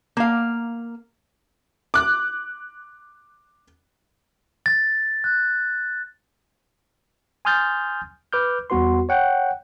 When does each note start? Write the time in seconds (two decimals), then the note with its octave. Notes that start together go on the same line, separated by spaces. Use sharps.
0.17 A#3 F5
1.94 D6 F#6
4.66 A6
5.24 F#6
7.45 G#5 C6 D#6 F6 G6 A6
8.33 B4 D6 F6 G6
8.70 E2 G3 B3 F#4 B4 C6
9.09 C#5 F#5 G5